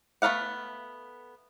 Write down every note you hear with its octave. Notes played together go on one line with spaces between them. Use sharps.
A3 B3 A#4 F5 F#5